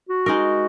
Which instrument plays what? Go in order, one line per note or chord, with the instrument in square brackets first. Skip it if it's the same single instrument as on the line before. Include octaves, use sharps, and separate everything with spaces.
[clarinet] F#4
[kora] G#3 D#4 A#4